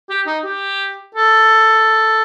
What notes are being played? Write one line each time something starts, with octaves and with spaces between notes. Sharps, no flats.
G4
D#4
G4
A4